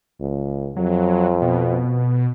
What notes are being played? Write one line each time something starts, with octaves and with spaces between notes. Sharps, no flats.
C#2
F2 F#3
B2